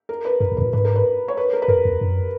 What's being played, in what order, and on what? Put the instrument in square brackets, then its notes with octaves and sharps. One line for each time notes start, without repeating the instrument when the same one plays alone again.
[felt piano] A#4
B4
[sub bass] F#2 [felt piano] A#4
[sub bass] E2
[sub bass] G#2 [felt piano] B4
[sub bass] A#2
[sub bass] G#2 [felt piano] B4
[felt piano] A#4
B4
C#5
B4
A#4
B4
[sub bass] F#2 [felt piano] A#4
[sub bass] E2
F#2